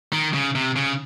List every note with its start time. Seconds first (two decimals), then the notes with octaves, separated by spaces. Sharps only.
0.13 D#3
0.34 C#3
0.55 C3
0.76 C#3